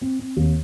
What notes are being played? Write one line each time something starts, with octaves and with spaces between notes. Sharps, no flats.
C4
C4
D#2